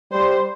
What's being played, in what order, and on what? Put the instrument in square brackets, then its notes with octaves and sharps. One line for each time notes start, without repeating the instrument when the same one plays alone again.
[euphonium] G3 [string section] C5